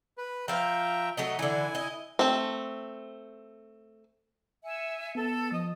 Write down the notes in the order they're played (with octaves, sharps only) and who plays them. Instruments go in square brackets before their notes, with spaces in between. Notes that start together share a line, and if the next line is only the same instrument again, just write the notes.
[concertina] B4
[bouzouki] F3 F5 [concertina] E5 G5 A#5
[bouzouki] F#3 A3 D#5
[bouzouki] D3 E3 [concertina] E4 G#5
[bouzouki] D#5
[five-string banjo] A3 C4
[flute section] E5 G#5 [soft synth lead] C#7
[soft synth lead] B3 [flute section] A4
[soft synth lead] F3 [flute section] D#5